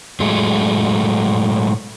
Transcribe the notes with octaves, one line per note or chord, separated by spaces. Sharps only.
A2 F#3 G#3 A3